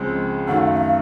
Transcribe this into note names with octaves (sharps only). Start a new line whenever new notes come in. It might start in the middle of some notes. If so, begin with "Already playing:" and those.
Already playing: C#2 C#3 F3 G#3 C4
F#2 D#3 F#3 A3 F#5
F5
E5
F5